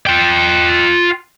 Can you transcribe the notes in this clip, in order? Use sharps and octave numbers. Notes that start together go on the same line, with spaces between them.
F4 G5